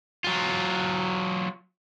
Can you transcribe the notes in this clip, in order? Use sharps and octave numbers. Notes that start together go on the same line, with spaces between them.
F#3 F4